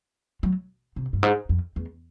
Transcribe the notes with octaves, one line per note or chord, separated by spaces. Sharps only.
F#3
C3
G2
G#2
F2
E2